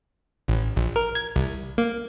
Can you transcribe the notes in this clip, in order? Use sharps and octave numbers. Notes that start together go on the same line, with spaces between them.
A1
A#1
A#4
G#6
C2
A#3